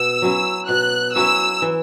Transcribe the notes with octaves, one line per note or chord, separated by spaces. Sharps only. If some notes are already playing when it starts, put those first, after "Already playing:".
Already playing: B2 E6
F#3 C#4 E4
B2 F#6
F#3 C#4 E4 E6
E3